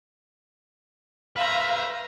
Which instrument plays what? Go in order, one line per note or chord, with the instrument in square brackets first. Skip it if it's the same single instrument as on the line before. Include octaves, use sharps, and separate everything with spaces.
[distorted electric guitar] B4 C5 [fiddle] E5 A#5 [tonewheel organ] F5